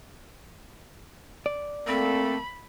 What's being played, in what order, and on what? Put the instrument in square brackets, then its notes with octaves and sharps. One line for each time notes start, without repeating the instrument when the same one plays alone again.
[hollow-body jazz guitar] D5
[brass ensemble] A3 A#3 A4 [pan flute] C4 [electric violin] B5